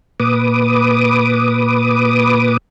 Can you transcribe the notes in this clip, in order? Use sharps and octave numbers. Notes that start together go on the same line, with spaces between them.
A#2 B4 D6 D#6